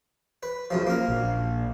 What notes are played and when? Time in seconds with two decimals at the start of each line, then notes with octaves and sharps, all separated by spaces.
0.43 B4
0.70 C#2 F#2 F3
0.87 A#3 A#4
1.08 A#1